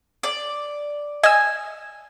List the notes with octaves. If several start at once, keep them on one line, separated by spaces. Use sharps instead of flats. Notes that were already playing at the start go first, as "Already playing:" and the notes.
D5
D#5 G#5 E6